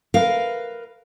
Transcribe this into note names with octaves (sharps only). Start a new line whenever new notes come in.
A#4 B4 F5